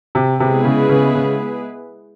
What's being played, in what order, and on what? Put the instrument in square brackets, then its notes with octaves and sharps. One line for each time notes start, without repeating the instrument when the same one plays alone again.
[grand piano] C3
[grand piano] C3 [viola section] G#3 B3 E4 G#4 B4
[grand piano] C#3
C#3
C#3